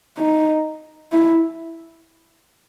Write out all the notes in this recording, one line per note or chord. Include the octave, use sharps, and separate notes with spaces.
D#4
E4